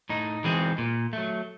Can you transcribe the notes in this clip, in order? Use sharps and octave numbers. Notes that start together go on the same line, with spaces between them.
A2 D#4
E3 G#3 C4
A#2
F#3 A3